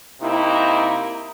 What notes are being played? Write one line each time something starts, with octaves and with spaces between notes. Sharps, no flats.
C3 A#3 D#4 E4